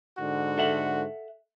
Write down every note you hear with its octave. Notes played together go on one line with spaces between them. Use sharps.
G#2 D3 F#4
A4 E5 F#5